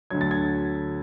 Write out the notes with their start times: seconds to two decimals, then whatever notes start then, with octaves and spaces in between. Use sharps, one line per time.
0.10 D2 D3 F#3 G#6
0.21 A6
0.31 G#6